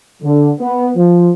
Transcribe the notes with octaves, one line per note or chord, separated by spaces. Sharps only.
D3
B3
F3